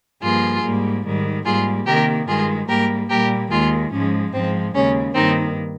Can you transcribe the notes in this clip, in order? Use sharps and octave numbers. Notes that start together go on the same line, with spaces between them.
G2 F3 A#3 F4 G#4
G#2 G3 A#3
G#2 D#3 G3
G#2 G3 A#3 F4 G#4
C3 D#3 A#3 G4 A#4
G2 D#3 G#3 F4 G#4
G#2 G3 A#3 G4 A#4
A#2 G3 A#3 G4 A#4
D#2 D#3 G#3 F4 G#4
G#2 F3 G#3 C#4
G#2 F3 G#3 C4
D#2 C#3 G#3 C#4
G2 D#3 A#3 C4 D#4